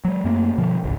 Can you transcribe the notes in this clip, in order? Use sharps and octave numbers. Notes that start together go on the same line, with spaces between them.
F#3 G#3
F#2 A3 A#3 C4
G2 B2 D3 F3
D1 G#1 C#2